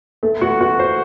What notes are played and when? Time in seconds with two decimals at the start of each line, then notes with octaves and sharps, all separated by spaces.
0.23 A3
0.41 F#4
0.61 F#4
0.79 C5